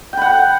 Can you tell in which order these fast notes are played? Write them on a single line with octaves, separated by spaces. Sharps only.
G5 B5 F#5